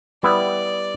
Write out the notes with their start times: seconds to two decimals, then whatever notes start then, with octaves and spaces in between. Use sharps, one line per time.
0.23 G3 B3 E4 D5